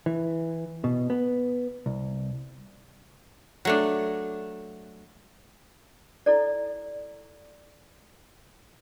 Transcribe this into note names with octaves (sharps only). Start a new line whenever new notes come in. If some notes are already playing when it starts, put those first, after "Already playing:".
E3
B2
B3
C2
F#3 A3 D4
E4 A4 D5